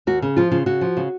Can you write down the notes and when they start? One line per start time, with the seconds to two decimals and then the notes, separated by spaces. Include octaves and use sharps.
0.07 D#2 F#4
0.22 C#3
0.36 F3 F4
0.52 C#3 F4
0.66 C#3 F#4
0.81 F3
0.97 C#3